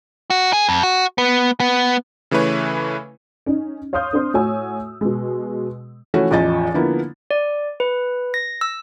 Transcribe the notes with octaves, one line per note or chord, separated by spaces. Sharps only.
F#4
G#4
F2
F#4
B3
B3
C#3 E3 A3 E4 B4 C#5
C#4 D#4
C#5 F5 C6 D#6 F6 G6
C4 D4 C5 C6
A2 F#4 C#5 G#5 E6
B2 G#3
E3 F3 A3 C#4 F#4 C#5
A1 E2 F3 D#5 A6
D3 F3 A#3 B3 E4
D5
B4
A#6
E6